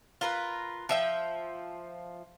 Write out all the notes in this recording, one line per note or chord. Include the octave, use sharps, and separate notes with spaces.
F4 A#4 B4
F3 E5 G5